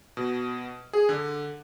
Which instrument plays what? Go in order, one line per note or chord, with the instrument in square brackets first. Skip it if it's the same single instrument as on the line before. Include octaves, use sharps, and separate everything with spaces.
[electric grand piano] B2
G#4
D3